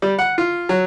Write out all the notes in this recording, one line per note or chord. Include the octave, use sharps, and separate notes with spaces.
G3
F#5
F4
F#3